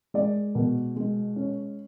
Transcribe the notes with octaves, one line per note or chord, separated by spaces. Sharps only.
G#3 D5
B2
G#3
C#4